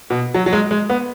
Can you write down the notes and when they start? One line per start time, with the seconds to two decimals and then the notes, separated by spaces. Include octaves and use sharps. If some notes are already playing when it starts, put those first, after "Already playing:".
0.10 B2
0.34 F#3
0.46 F#3
0.53 G#3
0.71 G#3
0.90 B3